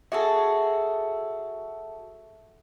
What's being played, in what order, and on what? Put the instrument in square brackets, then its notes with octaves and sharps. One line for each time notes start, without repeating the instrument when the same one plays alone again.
[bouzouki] F#4 G#4 A4 [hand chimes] E5 A5